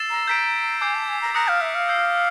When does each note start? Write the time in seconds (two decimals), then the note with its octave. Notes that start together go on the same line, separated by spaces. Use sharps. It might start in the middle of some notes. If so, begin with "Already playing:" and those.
Already playing: E6 A6 C7 E7
0.10 A#5
0.28 A#5 G6 B6 D7
0.81 G#5 D6 G6 C7
0.95 A5
1.08 G#5
1.21 A#5
1.35 A#5 D#6 F#6 A#6 C#7
1.48 F5
1.61 E5
1.75 F5
1.88 E6 G6 C7